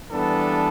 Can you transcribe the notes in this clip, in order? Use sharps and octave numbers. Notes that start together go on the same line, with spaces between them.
E3 G3 B3 D4 A4